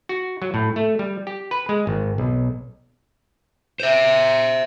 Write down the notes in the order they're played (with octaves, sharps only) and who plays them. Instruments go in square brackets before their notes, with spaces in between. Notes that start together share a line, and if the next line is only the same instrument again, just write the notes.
[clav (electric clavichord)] F#4
F#3
A2
A3
G3
G4
B4
G#3
G#1
B1
[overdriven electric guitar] C5 E5